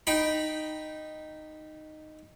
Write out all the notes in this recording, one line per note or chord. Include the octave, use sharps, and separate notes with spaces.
D#4 G5 B5